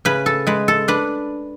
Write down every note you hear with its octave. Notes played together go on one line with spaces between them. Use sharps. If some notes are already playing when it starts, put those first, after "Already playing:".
C#3 B4
A4
G#3 B4
A4
D4 B4